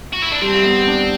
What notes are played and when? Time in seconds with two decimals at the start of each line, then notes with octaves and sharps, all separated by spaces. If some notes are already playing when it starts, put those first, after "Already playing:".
0.13 F#4
0.22 E4
0.32 D4
0.42 G3 C4
0.64 B3
0.88 D4